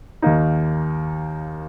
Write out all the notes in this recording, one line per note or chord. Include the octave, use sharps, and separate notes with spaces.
D#2 D#3 A#3 D#4